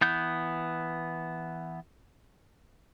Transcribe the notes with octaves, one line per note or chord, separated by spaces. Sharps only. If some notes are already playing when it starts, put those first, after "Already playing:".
E3 B3 G6